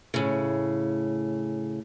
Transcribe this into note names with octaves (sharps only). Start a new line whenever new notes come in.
A2 C#3